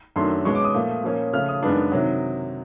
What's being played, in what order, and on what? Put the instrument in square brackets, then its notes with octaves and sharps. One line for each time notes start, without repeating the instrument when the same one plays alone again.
[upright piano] F#2 D#3 F#3 A3 D4 C6
B2 G#3 C#4 C#6
D6
D#6
A#2 F3 A3
A#2 F3 A#3 C#4
C#3 F3 A3 F6
D#6
F#2 D#3 G#3 B3 D4
C3 D#3 F#3